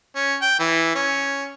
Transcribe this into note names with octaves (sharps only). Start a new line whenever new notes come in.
C#4
G5
E3
C#4